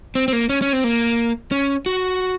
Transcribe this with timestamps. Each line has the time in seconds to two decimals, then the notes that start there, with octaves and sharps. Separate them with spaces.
0.15 C4
0.28 C4
0.33 A#3
0.49 C#4
0.62 C#4
0.73 C4
0.84 A#3
1.52 C#4
1.86 F#4